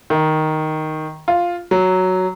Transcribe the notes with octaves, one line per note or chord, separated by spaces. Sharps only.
D#3
F4
F#3